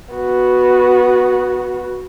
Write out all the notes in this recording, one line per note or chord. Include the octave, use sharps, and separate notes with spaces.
B3 F#4